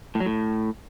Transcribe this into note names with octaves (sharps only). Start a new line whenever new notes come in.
A2
F#3
A2